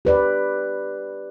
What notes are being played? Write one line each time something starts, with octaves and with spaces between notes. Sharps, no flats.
G4 B4 D5